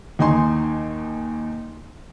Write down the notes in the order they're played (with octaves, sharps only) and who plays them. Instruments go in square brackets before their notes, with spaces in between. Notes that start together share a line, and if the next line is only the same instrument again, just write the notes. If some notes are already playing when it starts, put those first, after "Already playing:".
[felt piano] D#2 D#4 G#5 C6